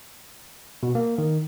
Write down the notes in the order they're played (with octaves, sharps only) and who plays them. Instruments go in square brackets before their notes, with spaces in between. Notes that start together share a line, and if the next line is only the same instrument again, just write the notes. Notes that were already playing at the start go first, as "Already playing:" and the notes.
[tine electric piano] B2
A#3
D#3